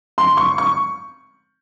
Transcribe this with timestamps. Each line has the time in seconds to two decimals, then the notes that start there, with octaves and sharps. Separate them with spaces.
0.18 C6
0.37 C#6
0.58 C#6